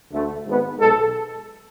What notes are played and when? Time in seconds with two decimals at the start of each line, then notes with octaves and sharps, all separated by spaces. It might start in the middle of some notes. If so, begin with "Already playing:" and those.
0.11 D2 D3 A3
0.46 G#1 G#2 G#3 B3
0.79 B1 B2 G#3 A4